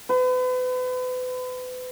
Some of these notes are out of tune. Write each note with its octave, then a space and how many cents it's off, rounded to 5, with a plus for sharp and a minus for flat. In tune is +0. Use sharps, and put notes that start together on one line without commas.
B4 +40